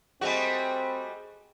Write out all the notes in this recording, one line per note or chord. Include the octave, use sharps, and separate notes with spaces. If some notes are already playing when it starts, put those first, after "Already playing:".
G3 A3 C4 F#4 G#4 D#5 G#5